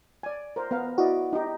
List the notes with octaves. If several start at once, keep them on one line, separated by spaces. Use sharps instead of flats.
D5 G#5
A#4 C5
B3 A#4 F5
E4 F#4 D5 D#5
D#4 G4